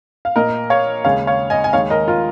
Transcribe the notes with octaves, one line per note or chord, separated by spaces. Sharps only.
F5
A#2 A#3 A#4 D#5
C#5 F5
D#2 C#3 G#3 C#5 F5
C#5 F5
D#5 G#5
G#5
D#2 D#3 G#3 C#5 F5
A#4 D#5
F4 A#4